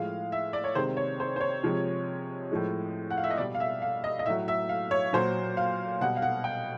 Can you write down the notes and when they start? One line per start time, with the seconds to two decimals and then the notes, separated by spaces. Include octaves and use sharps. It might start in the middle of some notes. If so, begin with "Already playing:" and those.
Already playing: A2 F3 G#3 F5
0.32 E5
0.53 D5
0.64 C#5
0.75 C3 D#3 G#3 C5
0.97 C#5
1.20 C5
1.36 C5
1.41 C#5
1.63 C3 F3 G#3
2.51 A2 F3 G#3
3.10 F#5
3.17 F5
3.24 E5
3.30 D#5
3.38 B2 G3 D5
3.55 F5
3.60 E5
3.82 F5
4.04 D#5
4.19 D#5
4.25 A2 E5
4.30 F#3
4.48 E5
4.69 F5
4.91 C#5
5.13 A#2 F#3 C5
5.57 F5
6.01 B2 G3 F#5
6.16 F5
6.22 F#5
6.44 G5